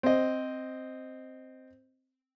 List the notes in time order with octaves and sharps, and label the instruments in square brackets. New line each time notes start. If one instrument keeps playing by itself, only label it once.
[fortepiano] C4 D#5